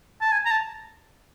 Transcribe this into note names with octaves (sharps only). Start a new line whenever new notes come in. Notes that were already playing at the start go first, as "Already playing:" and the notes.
A5
G#5
A#5
A5